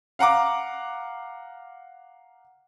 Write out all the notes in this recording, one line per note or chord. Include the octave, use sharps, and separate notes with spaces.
F5 F#5 A#5 D6